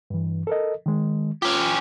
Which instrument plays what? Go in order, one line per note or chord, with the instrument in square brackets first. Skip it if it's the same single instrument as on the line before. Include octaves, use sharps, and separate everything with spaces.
[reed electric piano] G2 E3
A4 A#4 D#5
D#3 G#3
[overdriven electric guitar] C#4 G4 [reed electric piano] F4